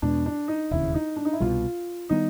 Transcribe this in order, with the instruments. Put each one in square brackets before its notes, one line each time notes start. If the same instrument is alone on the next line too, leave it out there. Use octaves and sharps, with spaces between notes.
[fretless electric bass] E2 B2 G#3 [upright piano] D4
[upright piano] D4
D#4
[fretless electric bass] E1 D#2 C#3 [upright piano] E4
[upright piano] D#4
D4
D#4
E4
[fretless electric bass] C2 B2 G3 [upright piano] F4
[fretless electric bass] D#3 G3 B3 [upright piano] D#4